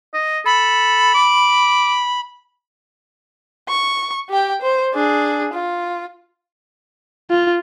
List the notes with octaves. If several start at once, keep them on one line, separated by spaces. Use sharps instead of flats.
D#5
A4 B5
D6
C#6
G4 G5
C5
D4 G#4
F4
F4